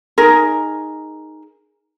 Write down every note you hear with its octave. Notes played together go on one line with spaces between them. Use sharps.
D#4 G#4 A#4